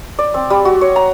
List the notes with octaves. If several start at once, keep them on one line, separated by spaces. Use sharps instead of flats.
D5
C4
G3
F#4
C#5
A#5